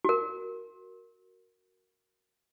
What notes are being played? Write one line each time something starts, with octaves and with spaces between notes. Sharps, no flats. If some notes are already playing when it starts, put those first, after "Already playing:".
F#4 A#4